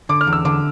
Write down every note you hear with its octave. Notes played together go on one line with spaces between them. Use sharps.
D3 D6
F6
E2
E6
D3 D6